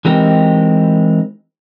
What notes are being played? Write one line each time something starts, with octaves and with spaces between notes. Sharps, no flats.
E3 G#3 C4 D#4 G4 A#4